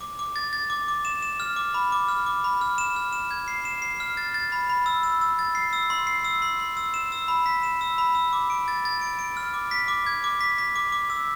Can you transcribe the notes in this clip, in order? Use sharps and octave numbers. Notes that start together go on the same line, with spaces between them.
D6
D6
A6
A6
D6
D6
E7
E7
F6
D6
B5
D6
F6
D6
B5
F6
E7
F6
E7
G#6
C7
E7
C7
F6
A6
A6
B5
B5
E6
E6
E6
A6
C7
E6
C6
C7
E6
C6
C6
E6
E7
E6
B5
B6
E7
E6
B5
E6
D6
D7
A6
A6
D7
D7
F6
D6
B6
D6
G#6
D6
B6
B6
D6
D6
E6